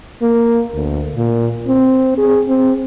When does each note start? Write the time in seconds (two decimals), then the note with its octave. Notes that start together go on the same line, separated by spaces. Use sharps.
0.22 A#3
0.74 D2
1.16 A#2
1.68 C4
2.18 G#4
2.48 C4